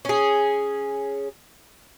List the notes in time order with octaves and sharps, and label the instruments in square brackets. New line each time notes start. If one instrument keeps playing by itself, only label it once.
[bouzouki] C#4 G#4